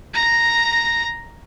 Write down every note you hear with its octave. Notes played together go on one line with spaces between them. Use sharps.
A#5 A#6